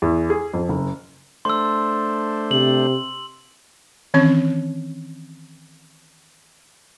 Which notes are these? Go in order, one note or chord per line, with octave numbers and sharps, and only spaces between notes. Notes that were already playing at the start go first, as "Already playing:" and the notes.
E2
G#4
F2
F#1
A3 D4 C5 C6 E6
C3 F#7
D#3 E3 C4 C#4 C#5